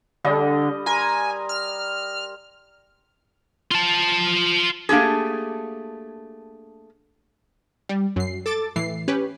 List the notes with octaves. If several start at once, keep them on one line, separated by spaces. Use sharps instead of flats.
D3 G3 D#5
A#4 G#5 A#5 C6
F6
F4 A5
A3 A#3 D4 G4 G#4
G3
F#2 C7
A4 D6 A6
A2 E3 C7
C#4 G4 B4